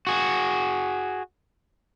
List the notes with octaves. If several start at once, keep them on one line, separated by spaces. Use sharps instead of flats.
F#4 G#4